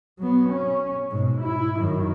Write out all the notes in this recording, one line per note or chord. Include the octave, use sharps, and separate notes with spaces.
F#3 B3
C#4
G#2 B2
E4
F#2 D#3